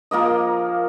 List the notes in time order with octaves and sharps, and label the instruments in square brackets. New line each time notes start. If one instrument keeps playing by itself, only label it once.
[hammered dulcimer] F3 A#3 A#4 D#5